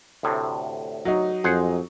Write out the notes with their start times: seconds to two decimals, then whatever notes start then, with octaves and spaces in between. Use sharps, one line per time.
0.23 D2 A2 C3
1.05 F#3 D#4
1.44 F2 G#4 C5 F#5